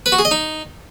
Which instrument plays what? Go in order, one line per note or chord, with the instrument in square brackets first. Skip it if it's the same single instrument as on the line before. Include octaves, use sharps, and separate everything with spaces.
[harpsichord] B4
F#4
G#4
D#5
D#4